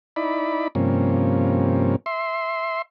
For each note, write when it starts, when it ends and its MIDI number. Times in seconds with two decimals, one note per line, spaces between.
0.16 0.68 63
0.16 0.68 64
0.16 0.68 74
0.16 0.68 83
0.75 1.96 43
0.75 1.96 48
0.75 1.96 53
0.75 1.96 58
0.75 1.96 61
2.06 2.82 76
2.06 2.82 84